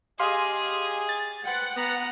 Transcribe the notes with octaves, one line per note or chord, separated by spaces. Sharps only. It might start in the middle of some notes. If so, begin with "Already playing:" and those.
G4 G#4 D#5 F5 C6
A6
B4 C5 F#5 G5
B3 A#5